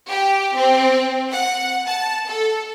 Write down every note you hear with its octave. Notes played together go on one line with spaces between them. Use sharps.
G4
C4
F#5
A5
A4